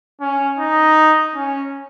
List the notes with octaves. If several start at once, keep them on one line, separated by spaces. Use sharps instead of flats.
C#4
D#4
C#4